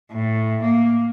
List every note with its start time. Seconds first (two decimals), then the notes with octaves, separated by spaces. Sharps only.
0.12 A2
0.63 A#3